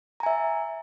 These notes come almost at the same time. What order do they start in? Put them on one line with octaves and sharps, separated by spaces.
A#5 G#5 E5